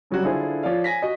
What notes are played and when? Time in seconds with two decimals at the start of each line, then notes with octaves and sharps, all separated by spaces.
0.11 C#3 F#3 G3 F#4 C#5
0.24 D3 E4 F4 G#4 A4 C5
0.63 F3 C#5 D5 F5
0.84 G#5 A#6 B6
1.02 F#4 D#5